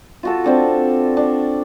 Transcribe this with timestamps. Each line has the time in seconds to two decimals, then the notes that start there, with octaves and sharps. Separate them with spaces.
0.23 F4 F#4 A4
0.44 C4 D4 A4
1.17 D4